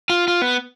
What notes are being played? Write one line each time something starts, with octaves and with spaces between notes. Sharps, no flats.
F4
F4
B3